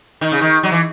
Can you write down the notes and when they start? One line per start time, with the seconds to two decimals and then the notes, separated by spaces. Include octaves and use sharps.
0.21 D#3
0.32 C#3
0.41 D#3
0.63 F#3
0.72 E3